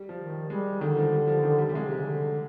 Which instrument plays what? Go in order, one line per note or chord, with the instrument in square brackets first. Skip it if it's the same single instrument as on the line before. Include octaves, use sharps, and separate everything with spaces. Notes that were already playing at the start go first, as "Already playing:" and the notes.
Already playing: [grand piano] G3
F3
[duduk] D#3
[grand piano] G3
[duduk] G3 [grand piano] G#3
[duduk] D3 [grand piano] D#3
[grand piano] F3
G3
F3
D#3
G3
G3
[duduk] C3 [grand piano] G#3
[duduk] D3
C3
D3